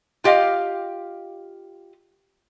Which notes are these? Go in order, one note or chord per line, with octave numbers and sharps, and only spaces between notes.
F4 G4 D#5 F5